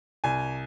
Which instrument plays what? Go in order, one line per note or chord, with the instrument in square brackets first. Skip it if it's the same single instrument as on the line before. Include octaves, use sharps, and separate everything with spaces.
[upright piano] C2 G#5